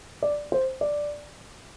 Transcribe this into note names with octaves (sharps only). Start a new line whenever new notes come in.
D5
C5
D5